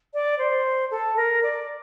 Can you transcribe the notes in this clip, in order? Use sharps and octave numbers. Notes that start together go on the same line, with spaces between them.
D5
C5
A4
A#4
D5